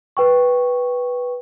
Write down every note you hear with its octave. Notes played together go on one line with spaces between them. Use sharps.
B4 G5 C#6